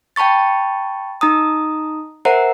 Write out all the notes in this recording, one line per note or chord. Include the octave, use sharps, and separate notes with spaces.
G5 A5 B5 C#6 A6
D#4 A#5 D#6
A#4 C5 E5 F#5 A#5